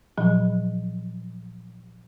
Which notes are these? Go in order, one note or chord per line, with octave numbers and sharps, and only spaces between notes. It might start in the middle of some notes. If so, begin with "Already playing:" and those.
A#2 F3 F#3